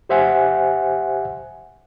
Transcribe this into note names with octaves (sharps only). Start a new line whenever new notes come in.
G4 C5 E5 F#5 G#5